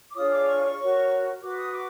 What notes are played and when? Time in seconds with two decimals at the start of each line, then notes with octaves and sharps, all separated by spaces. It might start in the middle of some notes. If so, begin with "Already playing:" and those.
0.09 D6
0.15 D4 F4 G#4 C#5 D#6
0.31 D6
0.47 C#6
0.79 F#4 A#4 C#5
1.42 F#4 B4 D6
1.57 D#6
1.73 D6